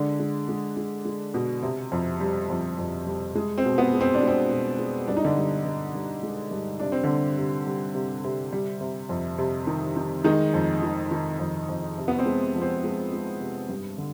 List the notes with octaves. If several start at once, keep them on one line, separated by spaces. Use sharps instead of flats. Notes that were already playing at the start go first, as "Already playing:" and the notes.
Already playing: D3 G#3 D4
G#3
G#3
G#3
G#3
B2
C3
F2
G3
F2
F2
G3
G#3
C4
B2
B3
G#3
C4
D4
G#3
C4
B2
G#3
G2 D4
D#4
D3 D4
G2
G2
G2
G#3
G2
C3 D4
C4
D3 D4
G3
C3
G3
C3
C3
G3
C3
F2
C3
D#3
D#3
D#3 G#3 D#4
F2
D#3
D#3
F2
F2
C3
B3
C4
G#3
F3
C4
G#3
G#3
C3
G2
D3